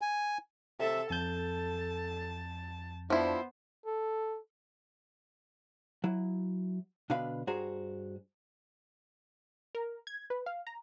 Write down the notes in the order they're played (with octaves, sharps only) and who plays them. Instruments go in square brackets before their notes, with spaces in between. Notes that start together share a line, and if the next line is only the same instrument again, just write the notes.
[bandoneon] G#5
[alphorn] C3 [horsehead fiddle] A4 E5
[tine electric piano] F2 G6 [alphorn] A4 [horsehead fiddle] A5
[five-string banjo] F3 E4 [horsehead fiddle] B3 C5 [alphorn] D4
[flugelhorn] A4
[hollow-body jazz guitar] F#3 E4
B2 D3 D4 B4 F5 B5
G2 F#4 G#4 C5 A#5
[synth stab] A#4
G#6
B4
F5
A#5